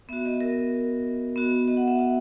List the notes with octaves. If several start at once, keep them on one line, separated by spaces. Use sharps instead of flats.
B3 F#4 E5
D#5
A#4
B3 F#4
D#5
F#5
E5
E5